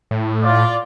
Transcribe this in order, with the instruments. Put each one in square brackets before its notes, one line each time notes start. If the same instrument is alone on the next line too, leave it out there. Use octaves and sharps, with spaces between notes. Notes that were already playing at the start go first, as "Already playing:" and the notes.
[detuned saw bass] A2
[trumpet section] F4 D5